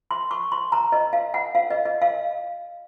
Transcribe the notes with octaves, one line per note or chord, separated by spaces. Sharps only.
C6
C#6
C6
A#5
D#5
F5
F#5
F5
D#5
D#5
F5